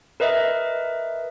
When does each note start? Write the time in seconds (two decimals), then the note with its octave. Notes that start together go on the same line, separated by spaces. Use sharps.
0.20 A#4 B4 D#5 E5